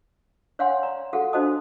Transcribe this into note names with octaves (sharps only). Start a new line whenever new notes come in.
C#5 D5 F5 F#5 G#5 C6
D5 A#5
F#4 G#4 A4 F5 F#5
D4 F#4 C5 D#5 A5 D#6